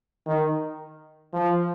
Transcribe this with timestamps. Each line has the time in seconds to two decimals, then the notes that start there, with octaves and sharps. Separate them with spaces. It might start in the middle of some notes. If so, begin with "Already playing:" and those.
0.27 D#3
1.33 F3